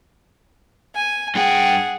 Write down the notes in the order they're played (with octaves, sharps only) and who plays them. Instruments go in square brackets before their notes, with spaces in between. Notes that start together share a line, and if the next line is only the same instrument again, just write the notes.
[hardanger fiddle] G#5
[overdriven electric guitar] G2 G5 [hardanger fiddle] G#4 F#5